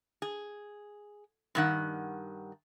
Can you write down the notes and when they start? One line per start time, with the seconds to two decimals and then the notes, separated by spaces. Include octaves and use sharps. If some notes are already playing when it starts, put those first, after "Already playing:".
0.22 G#4
1.55 G2 D#3 F#5